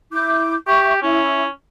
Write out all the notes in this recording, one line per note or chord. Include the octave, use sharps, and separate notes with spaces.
E4 D6 G6
G4 E5 C#6
C#4 E4